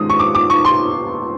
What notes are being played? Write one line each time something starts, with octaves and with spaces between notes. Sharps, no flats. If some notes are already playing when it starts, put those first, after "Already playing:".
Already playing: G#2 D#3 G#3 C#4 D#6
C#6
D6
D6
C#6
C6